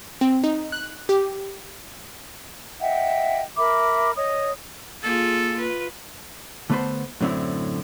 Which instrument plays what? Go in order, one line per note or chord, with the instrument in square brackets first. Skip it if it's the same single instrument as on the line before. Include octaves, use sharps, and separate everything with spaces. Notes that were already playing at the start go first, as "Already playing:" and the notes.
[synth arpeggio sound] C4
D#4
F#6
G4
[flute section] D#5 E5 F#5 G5
A#4 E5 B5 D6
C#5 D#5 D#6
[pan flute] A#3 [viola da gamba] F4 G#4 [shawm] A4
[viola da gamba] F4 B4
[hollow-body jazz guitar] D3 A3 B3 B4 C5
F#2 A2 D3 C4 E4